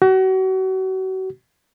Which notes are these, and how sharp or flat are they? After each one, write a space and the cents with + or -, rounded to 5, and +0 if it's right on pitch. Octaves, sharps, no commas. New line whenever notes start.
F#4 +35